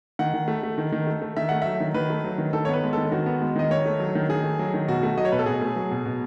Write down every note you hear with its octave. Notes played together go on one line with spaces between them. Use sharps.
D#3 F#5
D#3
A3
A3
D#3
D#3
A3
A3
D#3 E5
A3 F#5
F#3 E5
D#3
D#3 B4
A3
F#3
D#3
D#3 A4
C#5
B3 B4
G#3
D#3 A4
D#3 F#4
B3
G#3
D#3 D#5
D#3 C#5
A3
F#3
D#3
D#3 G#4
A3
F#3
D#3
B2 F#4
A3
F#3 D#5
C#5
B2 B4
A4
B2 G#4
A3
F#3
B2
B2